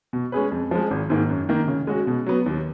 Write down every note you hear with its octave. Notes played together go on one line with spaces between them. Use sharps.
B2
G#3 C#4 G#4 B4
F2
F3 G#3
G#1
G#2 D#3 A#3
F#2
D#3 A#3
C#3
G#3 C#4 F#4
B2
F#3 B3
D#2